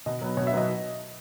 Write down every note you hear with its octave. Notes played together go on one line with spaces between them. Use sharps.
B2 D#5
F#3 B3
B2 C#5
E5
F#3 B3 D#5